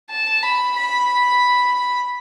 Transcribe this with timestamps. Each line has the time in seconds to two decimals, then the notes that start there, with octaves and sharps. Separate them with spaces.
0.10 A5
0.43 B5
0.77 B5